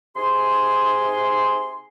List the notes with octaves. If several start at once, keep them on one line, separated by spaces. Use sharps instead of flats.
C3 D#4 G#4 G#5 C6